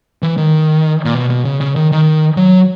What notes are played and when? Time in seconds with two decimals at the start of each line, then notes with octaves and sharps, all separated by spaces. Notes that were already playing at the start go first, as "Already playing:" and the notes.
0.22 E3
0.38 D#3
1.05 A#2
1.15 B2
1.30 B2
1.45 C#3
1.61 C#3
1.76 D#3
1.92 D#3
2.37 F#3